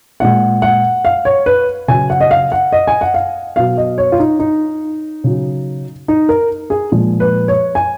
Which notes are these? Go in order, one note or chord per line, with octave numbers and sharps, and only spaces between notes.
A#2 G#3 F#5
F#5
F5
C#5
B4
C#3 F#3 G#5
F#5
D#5
F5
F#5
D#5
G#5
F#5
F5
B2 F#3 F5
D#5
C#5
F4
D#4
D#4
C#3 F#3
D#4
A#4
G#4
A#2 F3 G#3
B4
C#5
G#5